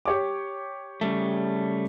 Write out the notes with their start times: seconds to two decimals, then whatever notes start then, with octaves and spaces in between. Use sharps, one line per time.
0.05 G4 C#5 D6
1.01 C#3 G3 A3